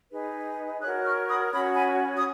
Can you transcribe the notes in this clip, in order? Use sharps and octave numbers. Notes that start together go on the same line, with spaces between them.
D#4 G#4 B4
F#4 A#4 C#5 D#6 F#6
C#6 F6
B5 D#6
C#4 F#4 C#5 B5 D#6
G#5 B5
D#6